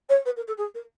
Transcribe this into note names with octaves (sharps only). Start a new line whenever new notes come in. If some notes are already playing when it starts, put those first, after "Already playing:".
C#5
B4
A#4
A4
G#4
A#4